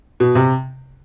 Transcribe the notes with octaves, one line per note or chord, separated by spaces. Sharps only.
B2
C3